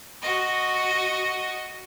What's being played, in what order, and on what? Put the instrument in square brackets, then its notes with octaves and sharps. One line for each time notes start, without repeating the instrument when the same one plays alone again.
[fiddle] F#4 D#5